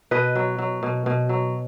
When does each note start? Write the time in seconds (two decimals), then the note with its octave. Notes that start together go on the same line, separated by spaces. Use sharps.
0.11 B2 B4 D#5
0.35 F#3
0.58 F#3
0.83 B2
1.06 B2
1.29 F#3